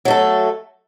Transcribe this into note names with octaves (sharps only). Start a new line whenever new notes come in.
F#3 A3 A4